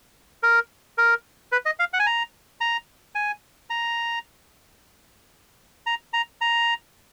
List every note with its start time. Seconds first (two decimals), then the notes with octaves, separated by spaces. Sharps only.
0.43 A#4
0.98 A#4
1.52 B4
1.66 D#5
1.79 F5
1.93 F#5
2.00 G#5
2.06 A#5
2.61 A#5
3.15 G#5
3.70 A#5
5.86 A#5
6.13 A#5
6.41 A#5